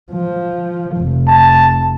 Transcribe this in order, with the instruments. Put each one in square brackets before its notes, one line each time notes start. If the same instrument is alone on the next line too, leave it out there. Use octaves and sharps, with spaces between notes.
[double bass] F3
F1
[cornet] A5